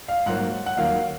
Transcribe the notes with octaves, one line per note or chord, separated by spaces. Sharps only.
F5
G#2 F#3 A#3 F#5
F#5
D#2 D#3 F#3 A#3 F5